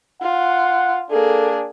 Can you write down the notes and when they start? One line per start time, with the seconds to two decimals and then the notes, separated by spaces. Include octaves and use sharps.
0.22 F4 F#5
1.11 A#3 D4 G#4 A4